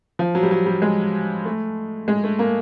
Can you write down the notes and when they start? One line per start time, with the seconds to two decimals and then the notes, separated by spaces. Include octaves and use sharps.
0.19 F3
0.35 F#3
0.43 G3
0.51 F#3
0.66 G3
0.82 G#3
1.45 A3
2.08 G#3
2.24 A3
2.39 A#3